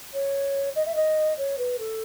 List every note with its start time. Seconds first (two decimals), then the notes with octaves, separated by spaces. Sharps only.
0.14 C#5
0.75 D#5
0.86 E5
0.95 D#5
1.37 C#5
1.58 B4
1.79 A4